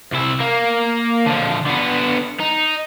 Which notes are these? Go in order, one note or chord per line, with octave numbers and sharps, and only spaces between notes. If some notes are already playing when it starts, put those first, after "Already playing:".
C2 E4
A#3
D3 F3
D3 B3
D#4